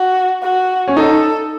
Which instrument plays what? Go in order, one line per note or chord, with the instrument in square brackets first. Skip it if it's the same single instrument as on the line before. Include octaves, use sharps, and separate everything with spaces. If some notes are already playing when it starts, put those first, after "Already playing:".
Already playing: [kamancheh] F#4
F#4
[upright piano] C#4
[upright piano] D#4 [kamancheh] A4